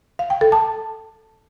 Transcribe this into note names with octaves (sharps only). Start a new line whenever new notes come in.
F5
G5
A4
A5